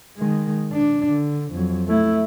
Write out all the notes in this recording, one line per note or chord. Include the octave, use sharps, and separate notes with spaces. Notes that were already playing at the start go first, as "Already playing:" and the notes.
D#3 G#3
D4
D3
F2 F#3
A3 E4